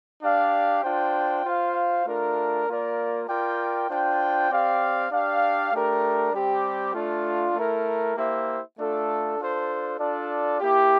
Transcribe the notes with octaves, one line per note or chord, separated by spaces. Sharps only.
D4 G4 D5 F5
D4 F4 C5 G5
F4 C5 F5
A3 D4 F4 A#4
A#3 F4 A#4 D5
F4 A#4 D5 G5
D4 F4 C5 G5
C4 G4 D5 F5
D4 G4 D5 F5
A3 D4 G4 A#4
G3 C4 G4
A3 D4 F4
A3 E4 A#4
A#3 E4 G4 C5 E5
A3 D4 F4 A4
D4 F4 A4 C5
D4 F4 A4 D5
A#3 E4 G4